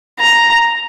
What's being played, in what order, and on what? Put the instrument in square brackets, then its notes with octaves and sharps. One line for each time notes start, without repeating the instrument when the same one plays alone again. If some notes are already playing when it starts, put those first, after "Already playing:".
[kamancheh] A#5